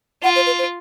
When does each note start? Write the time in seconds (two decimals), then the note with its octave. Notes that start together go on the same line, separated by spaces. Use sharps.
0.23 F4 F#5
0.36 C5
0.46 B4
0.59 C5